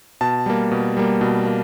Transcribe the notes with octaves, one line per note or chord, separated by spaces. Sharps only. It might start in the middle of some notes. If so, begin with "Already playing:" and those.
B2 A5
G3 A#3
B2
G3 A#3
B2
A#3